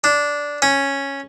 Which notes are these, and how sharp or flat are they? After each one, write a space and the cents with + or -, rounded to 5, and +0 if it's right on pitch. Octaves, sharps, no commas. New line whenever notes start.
D4 -10
C#4 -5